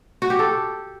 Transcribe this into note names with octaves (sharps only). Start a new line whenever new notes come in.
F#4
G4
A4